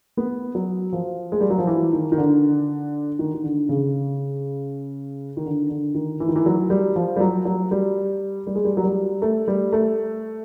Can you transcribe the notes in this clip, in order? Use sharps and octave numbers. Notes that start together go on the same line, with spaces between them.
B3
F#3
F3
G#3
G3
F#3
F3
E3
D#3
D#3
D3
D#3
D#3
D3
C#3
D#3
D3
D3
D#3
E3
D#3
E3
F#3
G3
F3
G3
F#3
F#3
G3
G3
G#3
G3
F#3
G3
A3
G3
A3